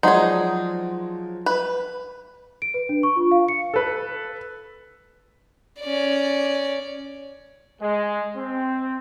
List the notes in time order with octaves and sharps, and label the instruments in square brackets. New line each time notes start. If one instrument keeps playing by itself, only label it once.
[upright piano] F3 F#3 G#3 [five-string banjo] D#4 G#4 [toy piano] D5 F#5 C6
[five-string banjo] B4
[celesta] D7
B4
D4
C#6
F4
F5
C#7
[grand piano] A4 B4
[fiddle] C#4 D5
[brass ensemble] G#3
C4